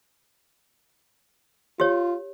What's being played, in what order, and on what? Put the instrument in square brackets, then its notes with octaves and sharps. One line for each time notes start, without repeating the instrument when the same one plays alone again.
[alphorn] F4 [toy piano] G4 C#5